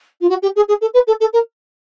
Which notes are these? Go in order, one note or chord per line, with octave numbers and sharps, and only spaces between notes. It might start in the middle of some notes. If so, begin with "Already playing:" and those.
F4
F#4
G4
G#4
G#4
A4
B4
A4
A4
A#4